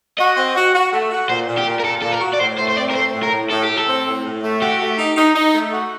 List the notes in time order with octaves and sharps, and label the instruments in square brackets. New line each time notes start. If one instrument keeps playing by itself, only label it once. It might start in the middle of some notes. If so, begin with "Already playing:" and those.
[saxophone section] F#4 [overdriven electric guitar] D#5
[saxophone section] C4
F#4
F#4
A3
F#4
[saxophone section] A#2 [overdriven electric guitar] C5
[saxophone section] A#2
[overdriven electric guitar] G4
[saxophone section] A#2
[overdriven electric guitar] A#4
[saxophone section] A#2 [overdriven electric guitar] A4
[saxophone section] A#2 [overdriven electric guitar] A4
[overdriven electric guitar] A#4
[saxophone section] F#4
[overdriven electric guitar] D5
[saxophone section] A2 [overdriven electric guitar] C5
[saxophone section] A3 [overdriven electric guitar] C5
[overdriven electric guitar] C5
[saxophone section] C4 [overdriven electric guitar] D5
[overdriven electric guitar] A#4
[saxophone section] A3 [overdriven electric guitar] C5
[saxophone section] A2
[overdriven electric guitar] A#4
[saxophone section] A2
[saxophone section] A2 [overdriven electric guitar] A4
[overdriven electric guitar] G4
[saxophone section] A2
[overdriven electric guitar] A4
[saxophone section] C4
A2
A2
A3
[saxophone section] F#4 [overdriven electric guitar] G4
[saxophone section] A3
D#4
D#4
D#4
A3
F#4